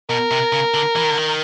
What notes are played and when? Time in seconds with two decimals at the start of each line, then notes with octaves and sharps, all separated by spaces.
0.10 B2 A#4
0.31 C3
0.52 C#3
0.74 D3
0.96 E3
1.03 D#3
1.11 D3
1.17 D#3